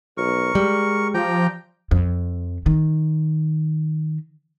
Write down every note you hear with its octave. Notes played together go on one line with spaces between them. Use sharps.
B1 A#4 C#6
G3 G#3
F3 G4 G5 A#5
F2
D#3